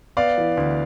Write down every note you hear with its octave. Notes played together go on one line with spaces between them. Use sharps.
B3 D5 F5
E3
D2